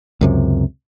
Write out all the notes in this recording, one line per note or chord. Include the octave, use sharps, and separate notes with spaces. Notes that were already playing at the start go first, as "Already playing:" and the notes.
C#2 F#2 C3